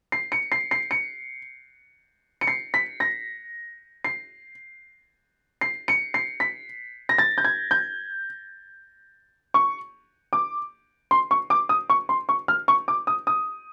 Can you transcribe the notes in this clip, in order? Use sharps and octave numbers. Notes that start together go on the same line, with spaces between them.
C7
C#7
C7
C7
C#7
C#7
C7
B6
A#6
C7
C7
C#7
C7
B6
A#6
A6
G6
G#6
G6
C#6
D6
C6
C#6
D6
D#6
C#6
C6
C#6
F6
C#6
D6
D#6
D#6